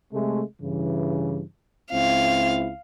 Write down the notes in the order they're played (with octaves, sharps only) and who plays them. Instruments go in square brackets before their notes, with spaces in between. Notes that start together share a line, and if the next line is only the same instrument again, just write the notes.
[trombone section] C3 G#3 A3
G2 C#3 E3
[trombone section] C#2 C4 E4 [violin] F5